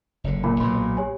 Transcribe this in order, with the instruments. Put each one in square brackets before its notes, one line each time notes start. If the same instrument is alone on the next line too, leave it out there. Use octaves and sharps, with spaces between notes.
[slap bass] F#1 B2 D3
[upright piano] A#2 [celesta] B5
[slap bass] B1 G#2 B2 [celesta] B5 C6
[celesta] G4 C#5 G#5